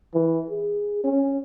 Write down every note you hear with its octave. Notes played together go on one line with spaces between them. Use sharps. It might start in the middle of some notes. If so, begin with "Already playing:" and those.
E3
G#4
C#4